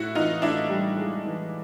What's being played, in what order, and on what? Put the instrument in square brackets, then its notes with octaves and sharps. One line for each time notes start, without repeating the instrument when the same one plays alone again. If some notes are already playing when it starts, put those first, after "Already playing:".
Already playing: [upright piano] A2 [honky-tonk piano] E4 F#4
[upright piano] E3 [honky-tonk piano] D#4 F4
[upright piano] A2 [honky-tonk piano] D4 E4
[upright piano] G3
G#3
E3